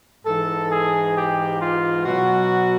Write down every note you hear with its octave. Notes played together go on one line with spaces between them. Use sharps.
G#2 E3 A4
G#4
G4
F4
B2 F#3 F#4